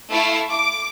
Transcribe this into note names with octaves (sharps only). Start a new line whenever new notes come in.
A3 E4 A4 F5 C#6 C7
D6